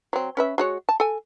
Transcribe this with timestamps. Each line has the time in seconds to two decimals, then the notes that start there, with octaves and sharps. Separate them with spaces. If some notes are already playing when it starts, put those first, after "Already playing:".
0.13 F#3 C4
0.37 C#4 B4 E5
0.58 G#3 F#4 C#5
0.89 A5
1.00 A4 G#5